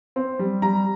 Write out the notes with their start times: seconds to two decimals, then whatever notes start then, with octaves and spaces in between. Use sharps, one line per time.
0.16 C4
0.39 G3
0.62 G3 A#5